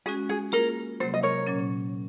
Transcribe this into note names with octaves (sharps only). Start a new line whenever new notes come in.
G#3 C#4 F#4 G#4
G#4
A#3 F4 G#4 A#4
C3 F#3 A#3 C5
D#5
A#4 C#5
A#2 F#3 C#4